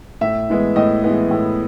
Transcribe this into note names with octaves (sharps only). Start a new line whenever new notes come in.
A2 E5
E3 G#3 B3
A2 D#5
E3 G#3 B3
A2